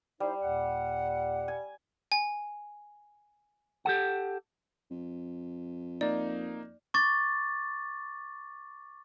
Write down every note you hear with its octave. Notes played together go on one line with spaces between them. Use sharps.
G3 D#4 E4 C5
D#2 A#2 F#5
G#5
G#5
G4 A4 F#5
F2
A#3 D#4 D5
C#6 D6 A6